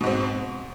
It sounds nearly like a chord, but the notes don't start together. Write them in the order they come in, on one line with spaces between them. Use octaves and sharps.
B2 G#2 C4